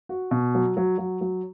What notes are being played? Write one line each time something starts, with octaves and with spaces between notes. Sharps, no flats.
F#4
B2
F#3
F#3
F#3
F#3